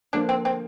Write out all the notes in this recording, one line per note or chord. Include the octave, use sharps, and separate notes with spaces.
D3 F3 A#3 D4
C4
C4